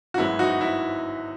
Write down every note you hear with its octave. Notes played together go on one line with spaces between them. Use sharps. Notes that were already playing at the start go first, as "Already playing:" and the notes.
F#4
G#1 F#2 E3 G#3 B3 E4
D#4 F#4
E4